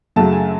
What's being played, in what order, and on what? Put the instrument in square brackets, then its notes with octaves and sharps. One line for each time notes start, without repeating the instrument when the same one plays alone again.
[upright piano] F#2 C#3 F#3 A3 A5
G#5